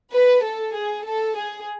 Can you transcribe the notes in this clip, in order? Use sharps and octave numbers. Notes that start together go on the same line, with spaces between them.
B4
A4
G#4
A4
G#4